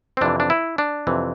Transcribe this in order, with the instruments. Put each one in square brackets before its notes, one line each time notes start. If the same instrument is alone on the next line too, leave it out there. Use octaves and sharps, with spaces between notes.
[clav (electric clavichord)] C4
F2 C3 E3 D4
D4
E4
D4
F2 C3 E3